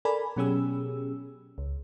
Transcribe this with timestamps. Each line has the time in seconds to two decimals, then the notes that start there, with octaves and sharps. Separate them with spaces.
0.05 A4 A#4 D5 G#5 A5 B5
0.36 B2 F#3 C#4 G4 G#4 E6
1.58 C#2